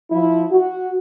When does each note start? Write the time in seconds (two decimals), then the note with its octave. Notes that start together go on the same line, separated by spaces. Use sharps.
0.11 F3 E4
0.51 F#4